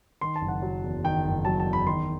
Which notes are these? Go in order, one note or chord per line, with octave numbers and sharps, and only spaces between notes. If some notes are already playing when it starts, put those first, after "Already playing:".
D#3 C6
A5
F#1
F#5
F#3
E2
D#3 G5
F#1
F#3 A5
A5
E2
B5
D#3 C6